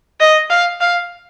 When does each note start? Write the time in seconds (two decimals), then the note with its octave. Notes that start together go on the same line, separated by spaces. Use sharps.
0.20 D#5
0.50 F5
0.81 F5